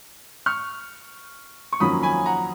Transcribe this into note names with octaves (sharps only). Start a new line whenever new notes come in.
C#6 F6
C#6
F2 D#3 F#3 A#3 C#4 B5 D#6
G#5 B5
F#5 A#5